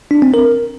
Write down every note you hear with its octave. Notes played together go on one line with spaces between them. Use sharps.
D4
C4
A#4